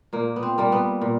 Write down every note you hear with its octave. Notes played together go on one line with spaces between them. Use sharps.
A#2 A#3
B3
C4
G3 A#3
B3
A#2